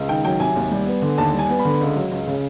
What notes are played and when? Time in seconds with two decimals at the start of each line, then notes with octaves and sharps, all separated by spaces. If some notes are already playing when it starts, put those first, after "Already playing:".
Already playing: C#2
0.09 D#3 G5
0.24 F#3 G5
0.40 C3 G#5
0.56 D#2
0.71 G3
0.87 B3
1.02 D3
1.18 D#2 A5
1.33 G3
1.39 G#5
1.49 B3
1.59 B5
1.65 D3
1.81 C#2
1.96 F#3
2.11 C#2
2.27 C#3